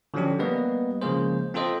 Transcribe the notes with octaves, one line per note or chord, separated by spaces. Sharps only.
D3 F3 F#3 C#4 D4 G4
G3 A#3 B3 B4 D#5
C#3 F3 G#3 A#3 G#4 C5
C4 F4 A4 C5 D#5